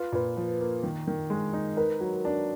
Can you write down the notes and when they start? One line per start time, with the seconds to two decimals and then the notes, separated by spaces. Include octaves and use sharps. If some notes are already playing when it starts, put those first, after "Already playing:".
Already playing: F4 B4
0.12 A#2 B4
0.37 F3
0.60 A#3
0.83 D#3
1.07 D#3
1.30 G#3
1.53 D#4
1.77 A#4 B4
2.00 F#3
2.25 D4